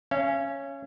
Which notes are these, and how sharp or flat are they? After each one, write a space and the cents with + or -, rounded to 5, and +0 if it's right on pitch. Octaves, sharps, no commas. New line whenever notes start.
C#4 +0 F5 -40